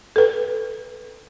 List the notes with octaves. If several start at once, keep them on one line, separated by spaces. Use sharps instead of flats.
A4 B4